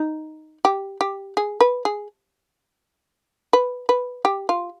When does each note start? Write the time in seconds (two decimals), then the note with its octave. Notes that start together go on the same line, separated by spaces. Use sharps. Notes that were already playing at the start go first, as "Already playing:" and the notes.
Already playing: D#4
0.65 G4
1.01 G4
1.37 G#4
1.61 B4
1.85 G#4
3.53 B4
3.89 B4
4.25 G4
4.49 F4